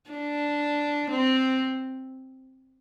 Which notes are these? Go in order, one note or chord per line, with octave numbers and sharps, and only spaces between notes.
D4
C4